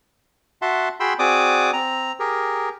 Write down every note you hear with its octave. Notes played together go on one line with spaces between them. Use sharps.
F#4 E5 F#5 A5 C6
F#4 G#4 G5 B5 C6 E6
C4 F#4 G#4 D5 D6 D#6
C4 A#5
G4 G#4 A#4